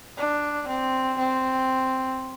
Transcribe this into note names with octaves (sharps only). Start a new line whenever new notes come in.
D4
C4
C4